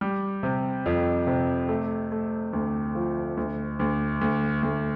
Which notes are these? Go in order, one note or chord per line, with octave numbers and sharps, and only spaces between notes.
G3
C3
F2
C3
A3
A3
D2
F3
D2
D2
D2
D2